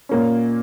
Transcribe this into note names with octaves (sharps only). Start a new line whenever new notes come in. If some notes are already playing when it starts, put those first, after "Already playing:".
A#2 A#3 C#4